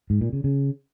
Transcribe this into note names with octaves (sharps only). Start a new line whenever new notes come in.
G#2
A#2
C#3
C#3